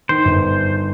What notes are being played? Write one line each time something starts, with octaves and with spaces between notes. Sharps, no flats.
D#3 C5
G1